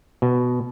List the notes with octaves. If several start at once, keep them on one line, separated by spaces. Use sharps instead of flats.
B2